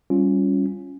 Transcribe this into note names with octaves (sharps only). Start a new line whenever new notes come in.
G3 C#4 F4